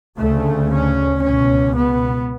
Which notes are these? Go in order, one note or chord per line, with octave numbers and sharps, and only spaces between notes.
D2 C#3 A3
C#4
C#2 B2 C#4
B3